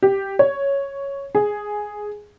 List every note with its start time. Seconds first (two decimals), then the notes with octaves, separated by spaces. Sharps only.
0.03 G4
0.39 C#5
1.35 G#4